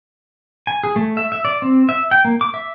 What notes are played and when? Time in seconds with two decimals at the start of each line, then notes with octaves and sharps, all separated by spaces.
0.67 G#5
0.84 G#4
0.96 A3
1.17 E5
1.32 E5
1.45 D5
1.62 C4
1.89 E5
2.11 G5
2.25 A#3
2.41 D6
2.54 E5